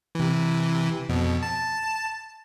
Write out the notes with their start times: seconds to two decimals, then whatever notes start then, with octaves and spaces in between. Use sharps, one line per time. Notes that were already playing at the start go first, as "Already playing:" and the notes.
0.15 C3 E3
1.09 F2 B2
1.43 A5